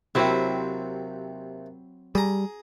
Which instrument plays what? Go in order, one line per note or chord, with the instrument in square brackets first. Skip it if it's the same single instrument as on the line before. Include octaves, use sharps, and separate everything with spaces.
[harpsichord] D#2 C3 [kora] F#3 C4 E4
[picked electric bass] G3 [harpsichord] G#4 A#5